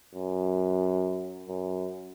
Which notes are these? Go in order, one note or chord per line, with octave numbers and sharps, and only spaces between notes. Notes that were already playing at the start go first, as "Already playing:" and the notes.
F#2
F#2